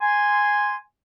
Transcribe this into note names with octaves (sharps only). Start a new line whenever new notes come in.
G#5 C6